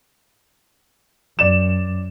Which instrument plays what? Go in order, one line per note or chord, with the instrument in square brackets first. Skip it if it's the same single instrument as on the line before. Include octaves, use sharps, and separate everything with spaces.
[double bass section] F#2 [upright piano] D5 E7